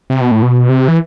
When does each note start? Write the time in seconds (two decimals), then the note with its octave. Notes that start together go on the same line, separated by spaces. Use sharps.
0.10 C3
0.21 B2
0.31 A2
0.42 B2
0.69 C3
0.88 E3